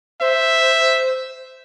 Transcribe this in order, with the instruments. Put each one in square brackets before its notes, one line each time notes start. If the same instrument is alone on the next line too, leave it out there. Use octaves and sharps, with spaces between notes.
[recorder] C5 [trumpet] E5